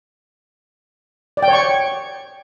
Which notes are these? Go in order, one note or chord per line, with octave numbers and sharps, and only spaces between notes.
D5
G5
C#5
C#6